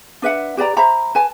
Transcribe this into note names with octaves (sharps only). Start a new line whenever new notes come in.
D4 B4 E5 F#5
G4 B4 D5 A#5
C5 E5 A#5 B5
B4 G#5 A5